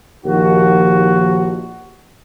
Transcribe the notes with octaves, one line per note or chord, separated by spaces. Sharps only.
A#1 D#2 F3 D#4 F#4